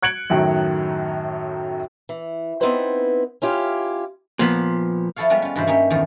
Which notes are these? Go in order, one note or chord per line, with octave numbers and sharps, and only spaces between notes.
F#6 G#6 C#7 D7 F#7
F#2 A2 D#3 F#3
E3
B3 C4 D#4 E4 B4 C5
C#4 E4 F4 G4
A#2 F3 B3
F3 E4 A4 C#5 F5
G3 G#3 B3 F4 G4
C#4 F4
G2 B2 E3 F4 C5 B5
A#3 C#4 D#4 G4 E5
E2 A2 D#3 F3